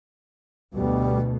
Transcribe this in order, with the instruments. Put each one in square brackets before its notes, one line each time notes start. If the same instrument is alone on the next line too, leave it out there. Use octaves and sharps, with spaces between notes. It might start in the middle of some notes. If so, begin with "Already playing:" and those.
[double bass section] D2 B2 [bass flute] G3